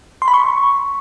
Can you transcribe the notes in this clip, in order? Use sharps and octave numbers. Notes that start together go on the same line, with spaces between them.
C6
B5
C#6